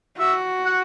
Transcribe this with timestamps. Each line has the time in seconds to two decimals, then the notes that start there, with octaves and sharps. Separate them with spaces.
0.18 F#4 E5
0.65 F#5